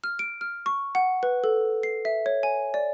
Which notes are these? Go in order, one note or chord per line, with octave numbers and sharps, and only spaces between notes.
F6
D7
F6
C#6
F#5
B4
A4
C7
E5
C#5
G#5
D5